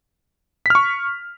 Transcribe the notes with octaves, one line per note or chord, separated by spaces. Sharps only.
C#6 F6 B6